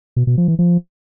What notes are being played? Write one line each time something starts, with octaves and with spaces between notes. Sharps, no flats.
B2
B2
F3
E3
F3